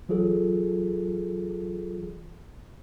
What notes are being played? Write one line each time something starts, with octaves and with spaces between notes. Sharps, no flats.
E3 F#3 F4 G#4 A4